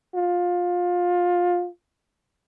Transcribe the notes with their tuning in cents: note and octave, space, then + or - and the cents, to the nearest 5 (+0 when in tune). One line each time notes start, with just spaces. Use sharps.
F4 +20